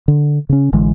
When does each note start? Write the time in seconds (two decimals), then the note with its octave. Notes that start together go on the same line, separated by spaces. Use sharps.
0.08 D3
0.49 C#3 C#4
0.72 A1 D3 E3 G#3